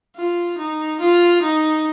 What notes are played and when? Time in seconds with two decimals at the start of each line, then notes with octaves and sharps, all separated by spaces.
0.16 F4
0.58 D#4
1.01 F4
1.43 D#4